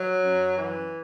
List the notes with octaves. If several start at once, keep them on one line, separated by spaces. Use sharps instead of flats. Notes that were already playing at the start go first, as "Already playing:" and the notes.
Already playing: F#3
F#2
E3